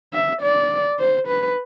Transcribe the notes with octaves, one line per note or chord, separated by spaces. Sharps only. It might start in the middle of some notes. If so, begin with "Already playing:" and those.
E5
D5
C5
B4